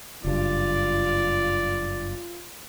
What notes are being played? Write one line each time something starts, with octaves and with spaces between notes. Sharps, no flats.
F#1 G2 F4 D5